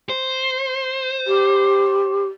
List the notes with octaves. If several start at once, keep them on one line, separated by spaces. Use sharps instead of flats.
C5
G4